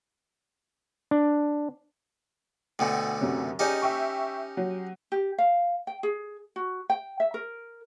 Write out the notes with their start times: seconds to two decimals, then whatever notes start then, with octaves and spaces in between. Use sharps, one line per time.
1.11 D4
2.79 D2 B2 D3 G5 G#5
3.21 F#2 C3 F#3
3.59 C#4 D#4 G4 G#4 D5 D#5
3.82 E5 G5 C#6
4.57 F#3
5.12 G4
5.38 F5
5.87 G5
6.03 G#4
6.56 F#4
6.90 G5
7.20 E5
7.34 A#4